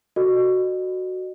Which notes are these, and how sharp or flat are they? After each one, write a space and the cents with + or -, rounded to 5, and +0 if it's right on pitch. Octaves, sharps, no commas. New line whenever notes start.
F#4 +0 A4 +40 D#5 -40